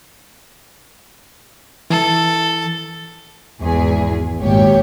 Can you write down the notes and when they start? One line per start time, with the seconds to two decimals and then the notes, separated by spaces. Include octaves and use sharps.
1.90 E3 A4
3.62 G#1 E2 G#4
4.40 G#1 D#2 A#2 G4 C#5